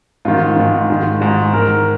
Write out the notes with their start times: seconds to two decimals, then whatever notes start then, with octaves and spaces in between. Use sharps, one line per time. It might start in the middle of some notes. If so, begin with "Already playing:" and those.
0.25 G#2 D#3 F4
0.57 G#2 D#3
0.90 G#2 D#3
1.21 G#2 D#3
1.53 G#2 D#3 A#4